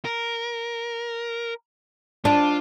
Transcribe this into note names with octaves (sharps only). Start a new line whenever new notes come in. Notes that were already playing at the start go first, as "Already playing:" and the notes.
A#4
D4 F4